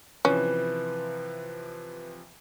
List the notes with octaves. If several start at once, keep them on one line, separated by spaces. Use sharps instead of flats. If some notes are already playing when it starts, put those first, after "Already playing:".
C3 E3 F3 C#4 B4